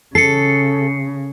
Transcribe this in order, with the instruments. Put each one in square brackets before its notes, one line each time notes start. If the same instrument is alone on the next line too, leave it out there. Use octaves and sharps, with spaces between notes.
[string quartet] C#3 [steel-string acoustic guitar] A4 [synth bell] C7 C#7